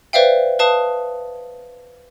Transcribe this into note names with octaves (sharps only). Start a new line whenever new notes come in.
B4 C5 D5 E5 F5 G5
B4 F5 A5 D#6